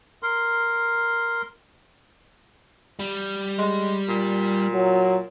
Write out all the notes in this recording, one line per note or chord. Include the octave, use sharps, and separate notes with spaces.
A#4 C6
G3
G#3
A#2
F#3